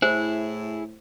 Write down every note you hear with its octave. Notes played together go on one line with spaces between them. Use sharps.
A2 E4 G#4 C5